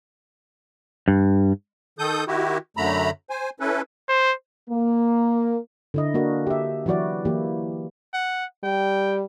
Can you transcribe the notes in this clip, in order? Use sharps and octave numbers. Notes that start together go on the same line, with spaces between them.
G2
D#3 A4 D#6 G6
D#3 E4 F#4 G4
F#2 D3 A3 A#5 B5
C5 G#5
C#4 E4 A4 B4
C5
A#3
D3 E4 D#5
A#3 D4 F#4 A#4
G4 E5
E3 F#3 E4 F#4 D5
E3 A#3 E4 G4
F#5
G3 G5